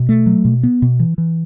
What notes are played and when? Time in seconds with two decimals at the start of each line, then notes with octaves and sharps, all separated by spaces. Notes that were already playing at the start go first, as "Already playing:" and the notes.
Already playing: B2
0.09 A3
0.26 F#3
0.45 B2
0.63 B3
0.82 B2
1.00 E3
1.18 E3